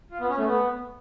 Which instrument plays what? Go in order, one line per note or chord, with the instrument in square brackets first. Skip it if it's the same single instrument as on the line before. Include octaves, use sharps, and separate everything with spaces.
[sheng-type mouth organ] F4
B3
C#4
A3
B3